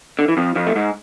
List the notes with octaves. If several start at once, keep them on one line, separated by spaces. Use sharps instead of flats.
D3
E3
F2 F3
F2 F3
A3
G#2 G#3